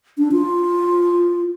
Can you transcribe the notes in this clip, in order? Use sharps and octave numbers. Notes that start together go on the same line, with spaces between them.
D4
F4